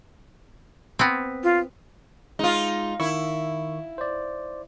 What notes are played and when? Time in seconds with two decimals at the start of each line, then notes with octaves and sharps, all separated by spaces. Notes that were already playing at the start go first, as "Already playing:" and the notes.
0.99 B3 C4
1.43 F4
2.39 G#3 D#4 F4
3.00 D#3 E4 C#6
3.98 C5 D5